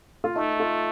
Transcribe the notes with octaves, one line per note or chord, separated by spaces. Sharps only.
F4
A3 D#4
F4